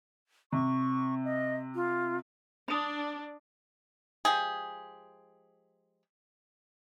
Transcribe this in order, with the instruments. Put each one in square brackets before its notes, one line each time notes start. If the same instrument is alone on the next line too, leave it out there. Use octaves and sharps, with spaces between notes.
[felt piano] C3 [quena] C#6
[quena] D#5
F4
[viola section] D4 [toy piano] B5 D#6
[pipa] F3 G#3 G4 G#4